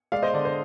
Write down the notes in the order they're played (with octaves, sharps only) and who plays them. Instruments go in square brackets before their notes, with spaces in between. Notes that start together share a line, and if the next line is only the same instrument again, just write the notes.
[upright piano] G#3 D5 F5
C5 D#5
D3 D5
C5